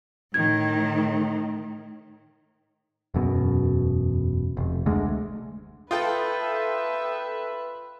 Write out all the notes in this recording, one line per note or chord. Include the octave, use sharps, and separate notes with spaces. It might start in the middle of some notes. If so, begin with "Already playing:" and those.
A2 D#3 G#6
E1 F#2 B2
F1
D2 G#3
F4 A4 B4 E5 G5 D#6